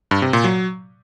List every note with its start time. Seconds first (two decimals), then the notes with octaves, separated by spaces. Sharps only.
0.11 G2
0.22 C3
0.33 A#2
0.44 F#3